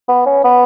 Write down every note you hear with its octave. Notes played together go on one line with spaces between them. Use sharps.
B3
C#4
B3